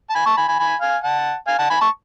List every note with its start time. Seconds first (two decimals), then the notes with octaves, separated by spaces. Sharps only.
0.10 A5
0.14 G#5 B5
0.25 A5 C#6
0.37 G#5 B5
0.48 G#5 B5
0.59 G#5 B5
0.81 F5 G#5
1.03 F#5 A5
1.47 F5 G#5
1.59 F#5 A5
1.70 G#5 B5
1.81 A5 C#6